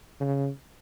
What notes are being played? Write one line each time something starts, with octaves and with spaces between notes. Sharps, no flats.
C#3